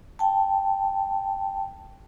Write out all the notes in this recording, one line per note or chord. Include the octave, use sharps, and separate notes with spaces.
G5 A5